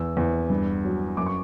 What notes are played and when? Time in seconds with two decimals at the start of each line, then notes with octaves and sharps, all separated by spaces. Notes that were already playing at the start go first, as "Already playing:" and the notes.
Already playing: E2 E6
0.17 E2
0.50 G2
0.85 F#3
1.17 F#2 D6
1.26 C#6